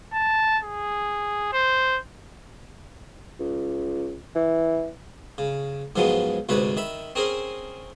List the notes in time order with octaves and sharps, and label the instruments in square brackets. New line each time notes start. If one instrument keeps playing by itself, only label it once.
[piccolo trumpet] A5
G#4
C5
[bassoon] C#2
E3
[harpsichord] C#3
G#2 D#3 F3 F#3 G#3 B3
D2 G#2 C3 B4 C#5 B5
D#3 E5 B5
C4 C#4 G#4 A#4 C5